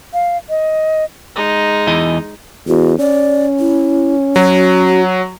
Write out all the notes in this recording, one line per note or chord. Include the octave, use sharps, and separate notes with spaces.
F5
D#5
G#3 D#4
E2 E3 D#5
E2 F#4
C#4 D5
E4
F#3 F#4